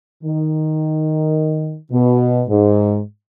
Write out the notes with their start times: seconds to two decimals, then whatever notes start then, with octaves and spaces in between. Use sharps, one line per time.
0.24 D#3
1.91 B2
2.48 G#2